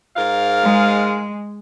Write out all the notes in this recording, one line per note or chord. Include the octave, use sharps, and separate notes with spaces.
G#2 A#4 F5
G#3